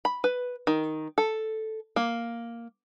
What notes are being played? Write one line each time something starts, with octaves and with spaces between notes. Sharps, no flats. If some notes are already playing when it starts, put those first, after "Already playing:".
B5
B4
D#3
A4
A#3